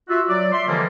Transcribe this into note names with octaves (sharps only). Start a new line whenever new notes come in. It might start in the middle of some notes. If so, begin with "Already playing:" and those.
F4 F#4 E5
F#3 D5
E5 C6
D3 E3 F3 G3 G#3 A#3